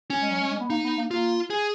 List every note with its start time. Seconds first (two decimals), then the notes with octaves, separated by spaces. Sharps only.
0.10 C#4
0.22 G#3
0.31 F#3
0.40 G#3
0.51 G#3
0.60 B3
0.70 A#3 D#4
0.84 B3
0.97 A#3
1.11 A#3 F4
1.50 G#4